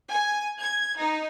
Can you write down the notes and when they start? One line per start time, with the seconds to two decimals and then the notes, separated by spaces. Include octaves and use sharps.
0.11 G#5
0.59 G#6
0.97 D#4